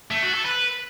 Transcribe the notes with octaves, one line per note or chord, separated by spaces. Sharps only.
A3
F#4
A4
B4